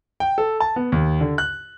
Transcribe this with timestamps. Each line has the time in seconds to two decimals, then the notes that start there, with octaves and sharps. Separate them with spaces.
0.20 G5
0.38 A4
0.60 A5
0.76 B3
0.92 D#2
1.21 D3
1.38 F#6